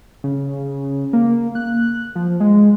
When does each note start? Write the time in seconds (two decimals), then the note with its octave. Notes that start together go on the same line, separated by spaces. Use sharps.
0.24 C#3
1.13 A#3
1.55 F#6
2.15 F3
2.40 G#3